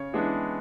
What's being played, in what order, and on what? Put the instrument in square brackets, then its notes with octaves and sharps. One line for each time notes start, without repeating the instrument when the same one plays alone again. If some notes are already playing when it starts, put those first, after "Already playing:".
Already playing: [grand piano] C#3 C#5
E3 G#3 B3 D4